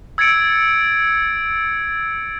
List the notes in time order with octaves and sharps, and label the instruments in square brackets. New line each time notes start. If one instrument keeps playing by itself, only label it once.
[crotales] E6 G#6 A6 C#7 D7